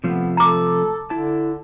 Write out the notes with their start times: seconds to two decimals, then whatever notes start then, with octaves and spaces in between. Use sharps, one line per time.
0.04 C3 F3 A3 B3
0.37 A4 A#5 D6
1.10 D3 E4 A5